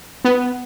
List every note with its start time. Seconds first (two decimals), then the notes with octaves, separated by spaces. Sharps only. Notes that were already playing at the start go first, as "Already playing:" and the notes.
0.24 B3